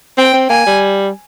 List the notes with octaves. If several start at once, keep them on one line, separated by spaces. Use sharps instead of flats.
C4 G5
C4
A#3 G#5
G3